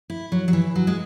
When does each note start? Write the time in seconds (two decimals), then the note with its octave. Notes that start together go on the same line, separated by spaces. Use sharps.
0.10 E4
0.32 F#3
0.48 F#3
0.53 E3
0.76 F#3
0.87 G#3